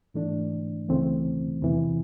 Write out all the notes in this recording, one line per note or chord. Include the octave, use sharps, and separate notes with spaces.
G#2 E3 A3 D4
C#2 C#3 E3 A3 C4
E2 C3 E3